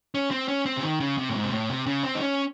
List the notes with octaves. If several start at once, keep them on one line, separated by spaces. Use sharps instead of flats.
C#4
C4
C#4
C4
C#3
D#3
C#3
C3
A2
G#2
C3
A2
C3
C#3
C4
D#4
C#4